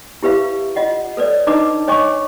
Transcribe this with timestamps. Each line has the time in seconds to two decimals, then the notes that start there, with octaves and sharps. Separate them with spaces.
0.23 E4 G4 B4 E5 F5
0.76 F4 D#5 F#5
1.17 A4 B4 C#5 D5
1.47 D4 D#4 B4 D#5 A#5 D6
1.88 C#5 D#5 G#5 C#6 D6